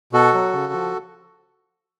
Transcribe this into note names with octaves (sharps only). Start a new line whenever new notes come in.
B2 F#4 A4
F#3
C#3
F3